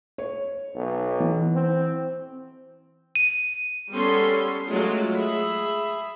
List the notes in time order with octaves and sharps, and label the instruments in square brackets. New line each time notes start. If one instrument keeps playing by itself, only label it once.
[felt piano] C#5
[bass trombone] B1
[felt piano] E3
[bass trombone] C4
[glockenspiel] D#7
[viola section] G3 B3 C#4 A4 C6
F#3 G#3 A3 F4
G#4 E5 B5